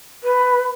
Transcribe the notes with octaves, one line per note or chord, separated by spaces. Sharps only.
B4